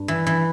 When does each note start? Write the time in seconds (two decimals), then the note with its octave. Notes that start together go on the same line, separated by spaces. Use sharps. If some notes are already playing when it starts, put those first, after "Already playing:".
Already playing: G2
0.08 E3
0.27 E3